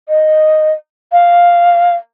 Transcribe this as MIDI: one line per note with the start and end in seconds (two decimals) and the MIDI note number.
0.09 0.72 75
1.12 1.95 77